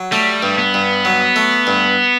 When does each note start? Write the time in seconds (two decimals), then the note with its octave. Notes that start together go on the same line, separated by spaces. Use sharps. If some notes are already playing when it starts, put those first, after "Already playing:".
Already playing: F#3
0.12 G3 A3
0.43 G2
0.58 B3
0.74 G2
1.05 F#3
1.36 A3
1.67 G2